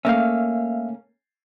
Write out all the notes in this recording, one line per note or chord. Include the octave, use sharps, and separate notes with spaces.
A3 A#3 C#4 E5 F5